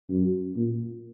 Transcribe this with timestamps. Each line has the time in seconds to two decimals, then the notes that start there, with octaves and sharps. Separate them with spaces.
0.09 F#2
0.56 A#2